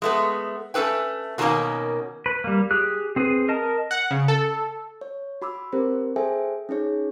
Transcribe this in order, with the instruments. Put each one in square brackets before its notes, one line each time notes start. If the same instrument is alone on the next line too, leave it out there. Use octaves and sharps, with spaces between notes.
[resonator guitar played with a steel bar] G#3 A3 B3
A3 C#4 A4 B4 G5
B2 D#3 F#3 A3 A#3 C#4
[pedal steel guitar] B4
G3 A#3
G4 G#4 F#6
C4 G#4 B4
A#4 D#5 A5
[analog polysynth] F#5
C#3
A4
[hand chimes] C#5
F#4 B5 D6 E6
C4 G4 A#4 C5
G#4 A4 C5 E5 G5 G#5
C#4 D#4 G#4 C#5